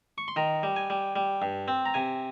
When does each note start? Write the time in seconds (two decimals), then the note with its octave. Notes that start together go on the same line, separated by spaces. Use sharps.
0.18 C#6
0.28 C6
0.36 D#3 A#5
0.63 G3
0.76 G#5
0.90 G3
1.16 G3
1.42 G2
1.68 C4
1.86 A#5
1.94 C3 G#5